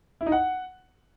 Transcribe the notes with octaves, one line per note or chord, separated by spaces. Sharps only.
E4
D#4
F#5